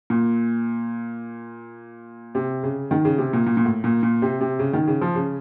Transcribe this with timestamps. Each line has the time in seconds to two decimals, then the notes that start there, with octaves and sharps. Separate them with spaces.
0.10 A#2
2.35 C3
2.63 C#3
2.91 D#3
3.05 C#3
3.18 C3
3.33 A#2
3.47 A#2
3.57 A#2
3.65 A2
3.84 A#2
4.03 A#2
4.22 C3
4.41 C3
4.59 C#3
4.73 D#3
4.87 C#3
5.01 F3
5.15 C#3